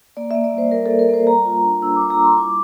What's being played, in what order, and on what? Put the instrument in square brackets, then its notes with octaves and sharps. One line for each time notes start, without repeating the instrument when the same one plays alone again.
[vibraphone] A#3 D5
E5
A#3
D5
G3 C5
G3 A#4
A4
A#3
A#4
A#3 C5
G3 A#5
F4
D4
D4 E6
D6
G3
A#5
G3 C6
E4 D6